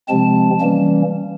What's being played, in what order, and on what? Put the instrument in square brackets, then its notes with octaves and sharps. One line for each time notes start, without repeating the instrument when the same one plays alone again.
[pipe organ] C3 F3 G#3 C4 A5
E3 G3 A#3 C#4